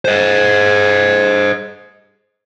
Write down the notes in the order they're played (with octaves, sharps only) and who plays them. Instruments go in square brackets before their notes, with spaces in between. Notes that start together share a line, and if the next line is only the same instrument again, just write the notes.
[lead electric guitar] C5 D#5